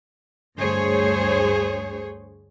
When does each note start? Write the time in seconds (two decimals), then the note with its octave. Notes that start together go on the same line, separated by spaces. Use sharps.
0.59 D2 G2 G#4 C5 C#5